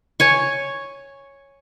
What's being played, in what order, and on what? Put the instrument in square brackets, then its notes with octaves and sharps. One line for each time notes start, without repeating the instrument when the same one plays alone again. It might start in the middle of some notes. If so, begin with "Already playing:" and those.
[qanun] C#5 G#5 C#6